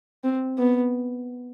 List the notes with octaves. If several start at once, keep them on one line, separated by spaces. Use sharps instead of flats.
C4
B3